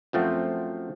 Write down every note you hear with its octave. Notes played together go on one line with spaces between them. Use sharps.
F#2 F3 A3 C4 F#4